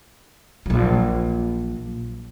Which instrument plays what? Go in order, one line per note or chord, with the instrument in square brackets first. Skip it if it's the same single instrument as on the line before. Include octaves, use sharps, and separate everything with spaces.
[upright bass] A#1 F#3